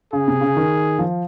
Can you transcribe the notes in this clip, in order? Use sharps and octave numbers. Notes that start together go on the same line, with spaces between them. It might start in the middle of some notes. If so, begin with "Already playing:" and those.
C#3 G#4
C3
C#3
D#3
F3